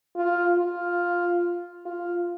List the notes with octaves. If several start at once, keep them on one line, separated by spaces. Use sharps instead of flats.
F4
F4
F4